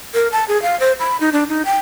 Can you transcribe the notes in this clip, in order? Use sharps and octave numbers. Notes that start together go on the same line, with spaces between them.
A#4
A5
G#4
F5
C5
B5
D#4
D4
D#4
G5